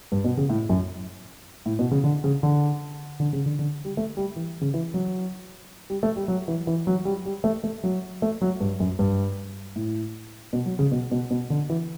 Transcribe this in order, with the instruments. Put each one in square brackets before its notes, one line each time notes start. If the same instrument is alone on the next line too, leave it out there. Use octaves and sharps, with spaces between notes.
[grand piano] G2
B2
C#3
A2
F#2
A2
B2
C#3
D3
C#3
D3
D3
C#3
D3
D3
G3
A3
G3
E3
C#3
E3
F#3
G3
A3
G3
F#3
E3
E3
F#3
G3
G3
A3
A3
F#3
A3
F#3
G2
F#2
G2
A2
B2
F#3
C#3
B2
B2
B2
D3
E3